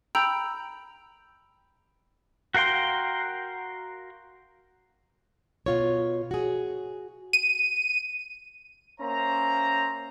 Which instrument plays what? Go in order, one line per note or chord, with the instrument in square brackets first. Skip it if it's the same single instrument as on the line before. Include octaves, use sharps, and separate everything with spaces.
[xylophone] G5 A#5 B5 E6 G6 D7
[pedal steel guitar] F#4 A#4 F5 G5 C6
[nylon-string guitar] B2 F4 C#5
F#4 G#4
[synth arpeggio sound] D#7
[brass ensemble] A#3 C#4 C5 E5 A#5